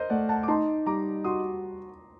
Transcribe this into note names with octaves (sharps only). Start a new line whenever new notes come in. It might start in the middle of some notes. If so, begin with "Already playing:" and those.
Already playing: A#4 C5 D#5
A3 D5 F#5
F#5 A5
D6
D#4 A5 C6
G3 A#5 D6
F#4 C6 D#6